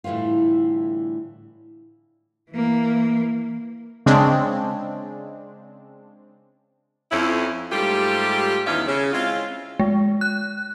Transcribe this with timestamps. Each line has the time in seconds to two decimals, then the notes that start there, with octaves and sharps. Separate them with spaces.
0.04 A2 D3 E3 G3 F4
2.51 E3 A#3
4.06 C#3 G#3 C4 D4
7.11 F2 C#4 E4
7.72 G#2 G3 A3 F4 G4
8.67 E2 D#3 E3 C#4 F4 E5
8.87 C#3
9.13 G#3 C4 E4 F4
9.80 G#3
10.21 F#6